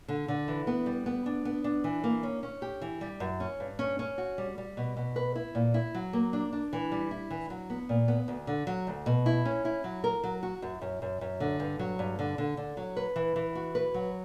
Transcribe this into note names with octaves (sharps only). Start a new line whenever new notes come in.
D3
D3
E3
B3
G3
B3
D4
B3
D4
E3
A#3
C#4
C#4
G4
E3
G3
F#2
C#4
G2
C#4
C#4
F#4
G3
G3
B2
B2
B4
E4
A#2
E4
F#3
A#3
D4
D4
E3
G3
E4
E3
F#3
B3
A#2
B3
D2
D3
F#3
D2
B2
E4
C#4
E4
F#3
A#4
F#3
F#4
F#2
F#2
F#2
F#2
D3
G2
F#3
G2
D3
D3
D3
F#3
B4
E3
E3
F#4
B4
F#3